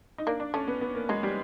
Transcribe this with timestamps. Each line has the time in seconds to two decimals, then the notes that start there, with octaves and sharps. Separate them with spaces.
0.18 D#4
0.27 A#3 D4
0.40 D4
0.54 A3 C#4
0.67 B3
0.81 B3
0.95 A#3
1.09 F#3 G#3
1.23 G3